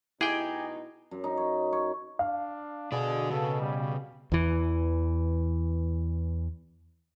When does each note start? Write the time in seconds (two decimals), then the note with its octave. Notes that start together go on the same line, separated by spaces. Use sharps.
0.21 B2 D#4 E4 G4 G#4 G5 G#5
1.11 F#2
1.24 D#4
1.37 C#5
1.73 C#5
2.19 D4 F5
2.92 B2 D3 G#4 D5
3.30 C#3 A4
3.60 G3
4.32 E2 E3